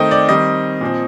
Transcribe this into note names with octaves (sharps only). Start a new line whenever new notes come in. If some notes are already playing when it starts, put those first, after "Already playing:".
Already playing: D#3 A3 C4 D#5 G5
D5
D#3 G3 C4 D#5
A#2 F3 C4